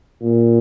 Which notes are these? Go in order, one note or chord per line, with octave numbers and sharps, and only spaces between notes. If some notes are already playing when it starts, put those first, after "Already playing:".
A#2